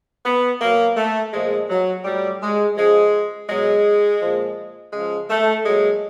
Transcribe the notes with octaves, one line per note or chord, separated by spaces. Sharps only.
B3
B2 F#3 A#3
A3
A#2 F3 G#3
F#3
A2 F#3 G3
G#3
C#3 F3 G#3
B2 F#3 G#3
A#2 F3
C#3 F3 G#3
A3
A#2 F#3 G#3